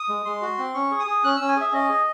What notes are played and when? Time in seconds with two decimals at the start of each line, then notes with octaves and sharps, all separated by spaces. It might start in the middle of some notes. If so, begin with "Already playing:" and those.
Already playing: D#6
0.09 G#3
0.25 G#3 C6
0.42 F#4
0.58 C4
0.74 C#4 C#6
0.91 G#4
1.00 D#6
1.07 G#4
1.24 C#4 F#6
1.36 C#4 E6
1.48 G#5
1.57 G#4 E5
1.73 C#4 D#5
1.89 G#4